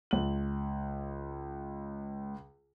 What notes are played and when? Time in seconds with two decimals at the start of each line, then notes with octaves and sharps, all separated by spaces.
0.11 C#2 F#7